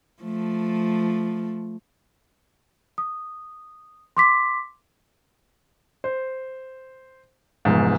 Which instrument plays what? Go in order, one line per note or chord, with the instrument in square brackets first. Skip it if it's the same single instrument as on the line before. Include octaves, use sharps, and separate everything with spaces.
[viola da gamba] F3 A3
[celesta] D#6
C6 D6 B6
[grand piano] C5
F1 E2 G#2